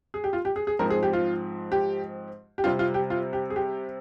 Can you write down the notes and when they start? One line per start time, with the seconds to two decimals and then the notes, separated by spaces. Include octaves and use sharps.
0.14 G#4
0.24 G4
0.33 F4
0.45 G4
0.56 G#4
0.67 G#4
0.79 G#2 F3 C4 A#4
0.90 G#4
1.03 G4
1.13 F4
1.72 G4
2.58 G4
2.64 C3 G3 C4 F4
2.79 F4
2.94 G4
3.10 F4
3.33 G4
3.50 G#4
3.56 G4